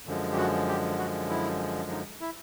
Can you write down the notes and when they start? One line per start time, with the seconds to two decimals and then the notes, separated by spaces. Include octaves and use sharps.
0.05 F#2 D3 F3 G#3
0.32 G4
0.37 F#4
0.68 G4
0.98 F#4
1.30 E4
1.90 D#4
2.21 E4